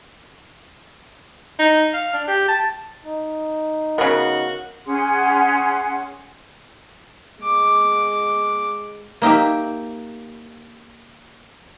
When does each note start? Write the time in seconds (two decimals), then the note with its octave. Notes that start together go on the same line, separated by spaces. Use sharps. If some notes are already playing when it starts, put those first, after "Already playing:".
1.59 D#4
1.93 F5
2.13 D4
2.28 G4
2.48 A5
3.05 D#4
3.98 C#3 B3 F#4 A#4
4.85 C#4 G#4 F#5 C6
7.43 G#3 D6
9.22 A#3 D#4 G4 E5